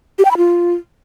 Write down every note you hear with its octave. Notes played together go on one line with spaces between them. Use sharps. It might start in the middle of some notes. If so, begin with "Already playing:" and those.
G4
G5
B5
F4